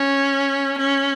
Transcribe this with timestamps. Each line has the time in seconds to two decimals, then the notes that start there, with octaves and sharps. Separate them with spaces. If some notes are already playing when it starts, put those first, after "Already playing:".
Already playing: C#4
0.78 C#4